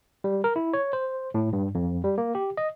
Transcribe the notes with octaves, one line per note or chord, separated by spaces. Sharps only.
G3
A#4
E4
C#5
C5
A2
G2
F2
G3
A#3
G4
D#5